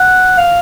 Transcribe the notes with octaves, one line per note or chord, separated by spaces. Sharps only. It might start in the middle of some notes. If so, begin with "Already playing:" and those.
Already playing: F#5
F5